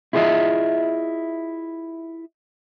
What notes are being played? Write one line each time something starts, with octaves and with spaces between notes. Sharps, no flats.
E4 F4 G#4 C5 D#5 E5